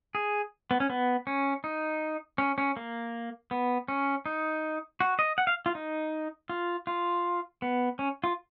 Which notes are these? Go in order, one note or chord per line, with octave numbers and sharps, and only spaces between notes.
G#4
B3
C#4
B3
C#4
D#4
C#4
C#4
A#3
B3
C#4
D#4
F#4
D#5
F#5
F5
F4
D#4
F4
F4
B3
C#4
F4